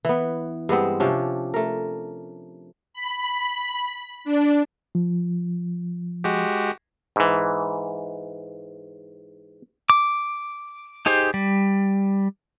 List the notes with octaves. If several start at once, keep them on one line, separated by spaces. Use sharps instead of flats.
E3 B3
G2 G#3 B3 C4
C3 F3 C#4 D4
A3 A#4
B5
D4
F3
G#3 F#4 G4
G#2 E3
D6
D#4 G4 G#4 C5
G3